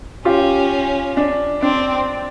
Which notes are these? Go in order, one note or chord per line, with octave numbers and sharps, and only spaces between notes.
C#4 F4 G4
D4
C4 D4